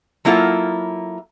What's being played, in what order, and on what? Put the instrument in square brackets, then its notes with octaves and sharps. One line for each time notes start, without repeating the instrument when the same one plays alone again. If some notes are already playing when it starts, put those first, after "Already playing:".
[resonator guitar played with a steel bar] F#3 A#3 E4 F4 A4